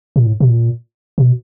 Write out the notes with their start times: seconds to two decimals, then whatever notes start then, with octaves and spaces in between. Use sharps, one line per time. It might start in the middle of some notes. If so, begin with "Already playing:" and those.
0.16 A#2
0.26 A2
0.40 B2
0.49 A#2
1.18 B2